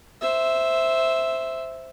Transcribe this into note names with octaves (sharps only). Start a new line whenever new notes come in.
C5 E5